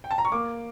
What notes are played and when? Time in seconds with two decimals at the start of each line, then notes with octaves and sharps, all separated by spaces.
0.04 G5
0.11 A5
0.18 A#5
0.25 C#6
0.32 A#3 D6